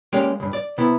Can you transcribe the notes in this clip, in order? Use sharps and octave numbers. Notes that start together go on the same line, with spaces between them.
G#3 A#3 C#4 G4 D5
C#2 G2
D5
C3 B3 E4